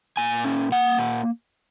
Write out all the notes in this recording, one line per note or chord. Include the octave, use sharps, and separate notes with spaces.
A#2 G#5
C#4
A#3 F#5
A#2